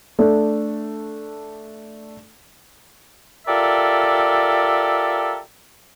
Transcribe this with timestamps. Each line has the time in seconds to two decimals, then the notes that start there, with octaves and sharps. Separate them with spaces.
0.19 A3 D4
3.47 F4 G4 A4 A#4 D5 E5